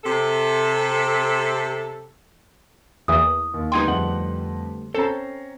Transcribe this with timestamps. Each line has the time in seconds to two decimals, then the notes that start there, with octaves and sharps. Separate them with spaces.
0.04 C3 A4
3.08 E2 E3 A#3 D#6
3.54 D#2
3.72 D2 G3 B3 D#4 G#4 G5 C6
3.88 F2 F#5 F#7
4.94 C4 C#4 A4 A#5